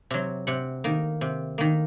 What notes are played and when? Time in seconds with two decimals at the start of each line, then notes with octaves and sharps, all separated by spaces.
0.11 C3 F#3
0.47 C3 F#5
0.84 D#3 A#3
1.21 C3
1.58 D#3 A#3